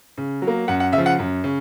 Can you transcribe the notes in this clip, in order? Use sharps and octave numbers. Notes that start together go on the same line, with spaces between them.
C#3
F#3
A#3
F#2 F#5
F#5
C#3 E5
F3
F#5
F#2
C#3